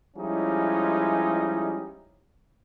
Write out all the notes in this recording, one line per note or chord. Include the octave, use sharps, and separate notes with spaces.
F3 G3 G#3 C#4 D#4 E4